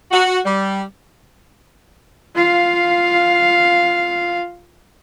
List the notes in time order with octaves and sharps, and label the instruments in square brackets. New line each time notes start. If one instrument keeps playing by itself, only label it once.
[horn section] F#4
G3
[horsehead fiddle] F4 F5